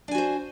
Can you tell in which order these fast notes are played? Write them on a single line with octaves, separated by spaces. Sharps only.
D4 G#5 F#4 C5